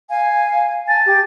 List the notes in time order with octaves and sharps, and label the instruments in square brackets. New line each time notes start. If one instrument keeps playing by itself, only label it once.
[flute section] F5 G#5
[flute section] G#5 A5 [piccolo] A6
[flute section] G4